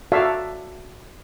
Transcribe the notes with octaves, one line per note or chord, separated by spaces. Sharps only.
F#4 A4 D5 E5 F5